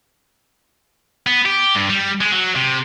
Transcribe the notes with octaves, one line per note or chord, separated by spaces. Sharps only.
B3
G4
G2
G3
G#3
F#3
C3